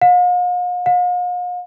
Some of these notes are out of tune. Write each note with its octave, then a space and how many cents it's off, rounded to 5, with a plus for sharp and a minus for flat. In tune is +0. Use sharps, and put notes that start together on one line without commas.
F5 +45
F5 +45